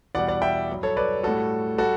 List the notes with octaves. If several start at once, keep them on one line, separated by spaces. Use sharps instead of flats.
E2 B2 G3 D5 F#5
D5 F#5
E5 G5
G2 F#3
A4 C#5
B4 D5
A2 G3 F#4 A4
G3 F#4 A4